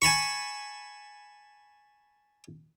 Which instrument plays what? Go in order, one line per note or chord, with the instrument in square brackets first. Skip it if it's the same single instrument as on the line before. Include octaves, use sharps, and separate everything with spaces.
[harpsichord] G#5 A5 B5 C#6